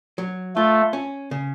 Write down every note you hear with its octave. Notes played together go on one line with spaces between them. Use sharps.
F#3
A3 F4
C#4
C#3